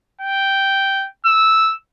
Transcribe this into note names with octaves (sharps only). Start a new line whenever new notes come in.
G5
E6